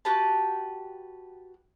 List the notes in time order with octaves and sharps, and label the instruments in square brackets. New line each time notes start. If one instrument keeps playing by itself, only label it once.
[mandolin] F#4 G4 B4 A5